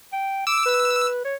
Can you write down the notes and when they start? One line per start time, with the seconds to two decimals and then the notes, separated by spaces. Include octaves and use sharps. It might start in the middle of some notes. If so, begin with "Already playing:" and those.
0.13 G5
0.47 D6 E6
0.66 B4
1.25 C#5